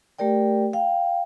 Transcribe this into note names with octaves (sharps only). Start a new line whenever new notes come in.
A3 G4 A#4 D5 G5
F5 G5